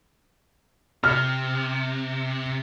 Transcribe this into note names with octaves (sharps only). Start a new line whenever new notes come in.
C3 F6